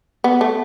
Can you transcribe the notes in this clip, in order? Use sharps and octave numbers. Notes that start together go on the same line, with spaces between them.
B3
A3